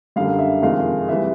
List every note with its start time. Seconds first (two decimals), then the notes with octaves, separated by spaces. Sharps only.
0.16 F#2 D3 G3 F5
0.39 E5
0.62 F2 C3 D#3 G#3 F5
1.09 C3 E3 G3 E5